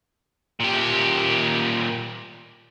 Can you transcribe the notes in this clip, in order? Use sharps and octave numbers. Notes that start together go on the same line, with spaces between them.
A#2 G4